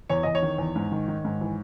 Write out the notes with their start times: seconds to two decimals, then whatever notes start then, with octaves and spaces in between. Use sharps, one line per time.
0.10 E2 C#5
0.23 E2 D#5
0.35 C#5
0.42 D#3
0.58 E2
0.76 G#2
0.92 D#3
1.08 D#3
1.25 G#2
1.41 E3